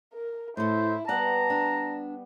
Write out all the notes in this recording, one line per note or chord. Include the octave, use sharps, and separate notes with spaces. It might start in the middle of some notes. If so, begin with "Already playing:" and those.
A#4
A2 E4 A4 C5
G3 B3 D5 F#5 A5 A#5
D4